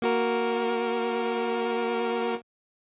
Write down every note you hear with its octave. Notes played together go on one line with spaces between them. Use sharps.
A#3 F#4 A#4